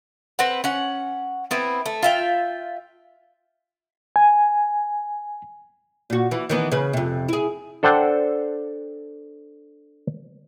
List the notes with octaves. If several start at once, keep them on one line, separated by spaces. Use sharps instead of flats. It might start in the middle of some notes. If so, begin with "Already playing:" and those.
C4 B4 F#5
C#4 F#5
B3 C4 E4
A3
F4 E5 G5
G#5
A#2 F#4
E3
D#3 E3 B3
C#3 G#4 B4
F2 C3
E4 G#4
D4 A4 C5 F#5 G5